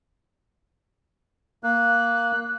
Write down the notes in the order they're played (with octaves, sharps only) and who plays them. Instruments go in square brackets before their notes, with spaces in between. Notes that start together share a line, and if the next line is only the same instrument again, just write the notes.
[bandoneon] A#3 [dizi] F#6